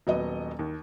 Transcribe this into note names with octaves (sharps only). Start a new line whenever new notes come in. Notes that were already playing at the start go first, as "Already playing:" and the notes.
D#1 F#3 B3 D#5
D#2